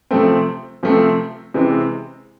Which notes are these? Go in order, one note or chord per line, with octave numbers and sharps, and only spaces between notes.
C3 F3 A3 C4
C3 F3 A3 C4
C3 E3 G#3 C4